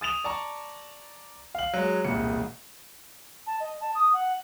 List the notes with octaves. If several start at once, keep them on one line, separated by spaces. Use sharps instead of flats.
D#6 A6 E7 F7
D5 A5 A#5 C#6
F5 F#7
F#3 G#3
E1 C2 A#2 C#7
A5
D#5
A5
D#6
F#5